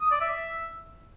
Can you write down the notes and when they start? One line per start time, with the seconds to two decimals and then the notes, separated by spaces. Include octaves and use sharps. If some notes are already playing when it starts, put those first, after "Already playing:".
0.01 D#6
0.11 D5
0.21 E5